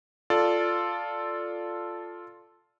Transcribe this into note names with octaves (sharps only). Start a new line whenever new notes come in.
F4 A4 D5